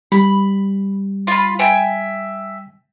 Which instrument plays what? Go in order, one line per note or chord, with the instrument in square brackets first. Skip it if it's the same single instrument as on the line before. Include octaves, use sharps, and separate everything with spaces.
[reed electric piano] G3 [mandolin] B5
[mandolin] F4 B5
E5 G5 G#5